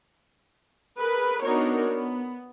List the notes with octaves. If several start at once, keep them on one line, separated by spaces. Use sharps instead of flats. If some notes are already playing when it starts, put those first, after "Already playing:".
G#4 A#4 B4
B3 D4 D#4 F#4 A#4 C#5
B3